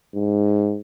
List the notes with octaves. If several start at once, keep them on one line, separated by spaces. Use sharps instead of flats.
G#2